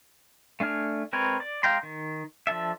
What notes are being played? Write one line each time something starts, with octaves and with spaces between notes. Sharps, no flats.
A3 D4 G#5 F6
G#3 C4 A#4 B4 C#5
D5
G#3 F5 G5 A#5 C6
D#3
F3 D4 A4 E5